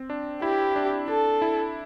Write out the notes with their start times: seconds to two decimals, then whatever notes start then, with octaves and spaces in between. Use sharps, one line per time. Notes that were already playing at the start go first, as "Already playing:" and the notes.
Already playing: C4
0.10 D4
0.42 E4 G4
0.76 D4
1.08 D4 A4
1.42 E4